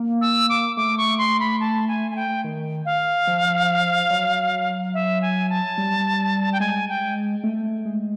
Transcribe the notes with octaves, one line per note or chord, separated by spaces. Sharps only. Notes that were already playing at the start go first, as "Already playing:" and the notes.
Already playing: A#3
E6
D6
A3 D6
C#6
C6
B5
A5
G#5
G#5
G5
D#3
F5
F3
F#3
E5
G#5
A5
G3
G5
G#3 G#5
G5
A3
G#3